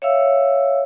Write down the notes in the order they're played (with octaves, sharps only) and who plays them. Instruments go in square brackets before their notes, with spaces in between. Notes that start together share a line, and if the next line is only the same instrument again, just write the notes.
[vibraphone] C#5 E5 F5 E6